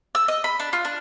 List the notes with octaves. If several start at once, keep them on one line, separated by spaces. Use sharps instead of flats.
E6
D#5
B5
D4
F4
D4